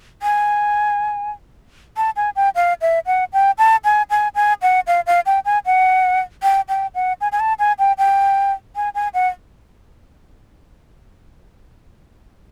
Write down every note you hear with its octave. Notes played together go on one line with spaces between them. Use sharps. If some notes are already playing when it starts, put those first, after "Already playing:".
G#5
A5
G#5
G5
F5
E5
F#5
G5
A5
G#5
G#5
G#5
F#5
F5
F5
G5
G#5
F#5
G5
G5
F#5
G#5
G#5
A5
G#5
G5
G5
G#5
G#5
F#5